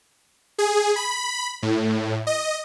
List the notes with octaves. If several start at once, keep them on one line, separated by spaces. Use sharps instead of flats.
G#4
B5
A2
D#5